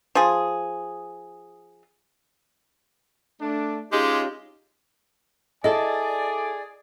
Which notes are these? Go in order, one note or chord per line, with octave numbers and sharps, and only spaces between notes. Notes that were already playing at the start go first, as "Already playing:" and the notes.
F3 G#4
A3 D4
G#3 C#4 D#4 F4 G4
E4 G#4 A4 D5 D#5 G#5